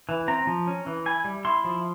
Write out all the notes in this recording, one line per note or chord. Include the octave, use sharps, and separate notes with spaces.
E3
C4 A#5
F3
C#4
E3
E4 G#5
G3
E4 C6
F3